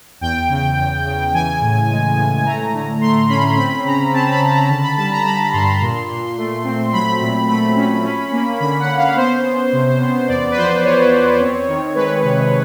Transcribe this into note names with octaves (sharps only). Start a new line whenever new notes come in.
E2 G5
C#3
E2
C#3
E3 G#5
A2
G#3
A2
A3 A#5
D3
A3 C6
C#4 B5
C4 B5
C#3 A#5
C4 A5
B5
C#3
A#5
D3 A5
B5
G3 A5
A#5
G3 B5
G2 C6
A#2
A#2
A3
C4
F#3 B5
A#2 B5
A3 B5
C#4
C#4
A#3
D3 B5
F#5
C#4
F5
B3 C5
B3
C3
B3
E2 D5
B4
F3 C5
E2 C#5
E2
C4
D#3
G#3 B4
C3